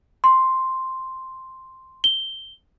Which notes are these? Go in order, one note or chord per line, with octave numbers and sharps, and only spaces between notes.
C6
G7